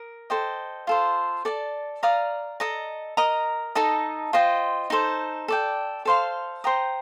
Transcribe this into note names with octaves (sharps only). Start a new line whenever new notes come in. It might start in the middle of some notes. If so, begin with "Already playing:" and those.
Already playing: A#4 D#6
A4 C5 D#5 G5
F4 A4 C5
A4 D5 A5
D5 F5 A#5 D#6
A4 D#5 A#5
A#4 D#5 A#5 D#6
D#4 A4 D#5 A5
F4 C5 D#5 G5
D#4 A4 C5
A4 D5 G5
A4 C5 F5 C6
C5 G5 A#5 D#6